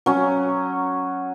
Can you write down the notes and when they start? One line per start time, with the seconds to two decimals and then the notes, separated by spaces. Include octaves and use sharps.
0.06 F#3 C#4